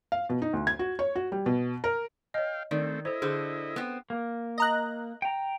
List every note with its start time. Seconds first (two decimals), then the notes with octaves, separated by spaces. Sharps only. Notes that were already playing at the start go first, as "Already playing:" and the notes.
0.12 F5
0.29 B2
0.42 D#4
0.53 D2
0.67 G#6
0.79 F#4
0.99 C#5
1.16 F#4
1.32 G3
1.46 B2
1.84 A#4
2.34 C#5 D#5 F5 G5
2.71 D#3 A3 C4 D5
3.05 E4 A4 C5 D#5
3.22 D3 G#4 C5
3.76 B3 C4
4.10 A#3
4.58 D#5 A#5 F#6
5.22 G5 A#5